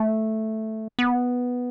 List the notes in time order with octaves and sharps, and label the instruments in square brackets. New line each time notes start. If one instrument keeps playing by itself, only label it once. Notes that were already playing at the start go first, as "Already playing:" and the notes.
Already playing: [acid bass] A3
B3